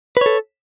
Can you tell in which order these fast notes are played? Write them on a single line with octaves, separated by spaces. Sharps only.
B4 C#5 A4